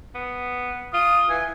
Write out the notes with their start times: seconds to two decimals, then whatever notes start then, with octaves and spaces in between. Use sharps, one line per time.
0.15 B3
0.94 F4 D#6
1.30 E3 G#5